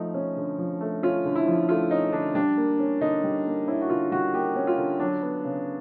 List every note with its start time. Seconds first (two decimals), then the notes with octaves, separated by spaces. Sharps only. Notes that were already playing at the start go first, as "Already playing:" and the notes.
Already playing: F3 A3 D#4
0.14 C#4
0.36 D3
0.58 F3
0.81 A3
1.03 C#4 F4
1.25 D3
1.35 E4
1.47 F3
1.69 A3 F4
1.91 C#4 D#4
2.13 D3 D4
2.35 G3 D4
2.57 A#3
2.79 C#4
3.01 D3 D#4
3.23 G3
3.46 A#3
3.67 C#4 E4
3.81 F#4
3.90 D3 F4
4.11 G3 F#4
4.34 A#3 G4
4.56 C#4
4.67 F4
4.78 D3
5.00 F#3 D4
5.22 B3
5.44 C#3